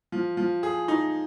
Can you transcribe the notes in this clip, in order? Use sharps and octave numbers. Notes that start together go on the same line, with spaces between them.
F3
F3
G#4
D#4